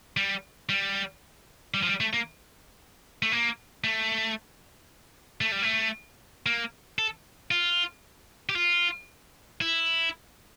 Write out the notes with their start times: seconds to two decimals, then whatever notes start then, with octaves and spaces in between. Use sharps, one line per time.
0.17 G3
0.69 G3
1.74 G3
1.83 F3
1.87 G3
2.00 A3
2.13 A#3
3.22 A3
3.32 A#3
3.84 A3
5.41 A3
5.52 G3
5.63 A3
6.46 A#3
6.99 A4
7.51 F4
8.49 G4
8.56 F4
9.61 E4